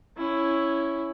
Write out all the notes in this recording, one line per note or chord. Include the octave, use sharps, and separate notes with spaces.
C#4 E4